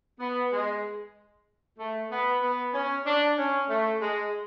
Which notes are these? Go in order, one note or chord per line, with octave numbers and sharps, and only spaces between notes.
B3
G#3
A3
B3
B3
C#4
D4
C#4
A3
G#3